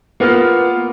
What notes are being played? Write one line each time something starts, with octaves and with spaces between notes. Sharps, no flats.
A#3 B3 F4 F6